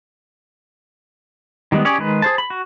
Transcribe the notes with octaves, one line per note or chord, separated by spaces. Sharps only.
D#3 G3 G#3 B3
C#4 G4 G#4 C#5 D5
D#3 G#3 B4
G#4 C5 A5
B5
F#4